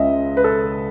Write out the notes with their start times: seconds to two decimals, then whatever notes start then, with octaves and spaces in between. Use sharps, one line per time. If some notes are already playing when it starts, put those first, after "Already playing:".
Already playing: C#2 C#3 G#3 D#5 E5
0.37 B4
0.44 A4